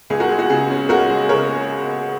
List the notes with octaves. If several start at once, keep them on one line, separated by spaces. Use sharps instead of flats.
C#2 G#4
F#4 A#4
G#3 G#4
F#4
C#3 G#4
C#4
C#2 F#4 A#4
G#3
C#3 A#4 C#5